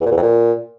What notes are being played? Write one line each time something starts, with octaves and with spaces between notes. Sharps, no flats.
E2
A#2
E2
F2
A#2